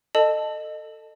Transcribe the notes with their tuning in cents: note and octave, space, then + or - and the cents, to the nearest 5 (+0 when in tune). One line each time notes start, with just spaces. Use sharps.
A4 +20 D#5 -20 A5 +0